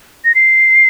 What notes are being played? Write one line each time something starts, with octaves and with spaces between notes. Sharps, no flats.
A#6
C7